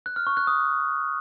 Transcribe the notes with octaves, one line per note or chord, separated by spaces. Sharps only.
F#6
F6
C#6
F#6
D#6